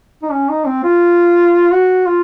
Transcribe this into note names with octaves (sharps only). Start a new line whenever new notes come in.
D#4
C#4
D#4
C4
F4
F#4
F4